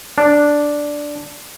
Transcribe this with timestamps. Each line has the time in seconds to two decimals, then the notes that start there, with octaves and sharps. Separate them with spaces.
0.18 D4